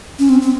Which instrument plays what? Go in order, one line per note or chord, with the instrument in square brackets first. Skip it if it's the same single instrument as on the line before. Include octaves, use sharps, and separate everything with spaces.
[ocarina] C#4
C4
C4